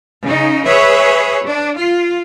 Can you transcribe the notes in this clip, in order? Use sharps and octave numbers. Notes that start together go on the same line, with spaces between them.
C#3 D#4
G#4 B4 C#5 E5
D4
F4